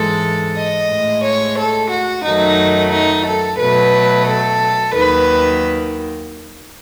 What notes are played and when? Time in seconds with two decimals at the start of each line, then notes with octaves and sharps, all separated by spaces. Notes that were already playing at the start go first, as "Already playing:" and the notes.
Already playing: G#2 E3 G#3 A4
0.56 D#5
0.90 A2 G#3
1.24 C#5
1.58 A4
1.91 F#4
2.25 F#2 D#3 F#3 A3 D#4
2.92 D#4
3.26 A4
3.59 B2 F#3 A3 B4
4.26 A4
4.94 D#2 D#3 F#3 B4